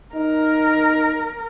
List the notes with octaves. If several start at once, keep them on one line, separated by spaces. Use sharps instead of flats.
D#4 A#4